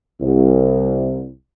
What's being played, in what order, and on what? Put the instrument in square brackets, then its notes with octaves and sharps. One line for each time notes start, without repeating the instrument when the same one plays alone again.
[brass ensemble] C2